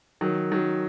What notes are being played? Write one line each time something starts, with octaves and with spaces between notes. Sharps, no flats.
D#3 F#3
D#3 F#3